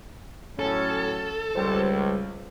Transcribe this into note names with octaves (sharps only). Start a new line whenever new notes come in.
A2 F#3 C#4 A4
C#2 G3 C5